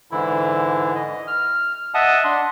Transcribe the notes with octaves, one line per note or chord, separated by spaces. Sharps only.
G#2 D3 E3 E4
D#5
F6
D#5 E5 F#5 A5 D#6
D4 C6